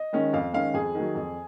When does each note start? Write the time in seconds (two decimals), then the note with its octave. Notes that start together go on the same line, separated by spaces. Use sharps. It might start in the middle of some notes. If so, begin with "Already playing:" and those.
Already playing: D#5
0.13 D#3 G#3 C#4
0.33 F2 F5
0.53 D#3 G#3 C#4 F5
0.74 F2 G#4
0.95 D#3 F#3
1.15 F2